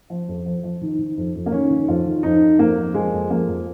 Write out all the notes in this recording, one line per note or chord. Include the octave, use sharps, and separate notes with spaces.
F3
F2
F3
F3
D#3
D#3
F2
F2
A#3
D#3 C#4
D#3
F2 F4
D#3
F2 D#4
F3
F2 A#3
F2
F3 G#3
F2
F3 A#3
F2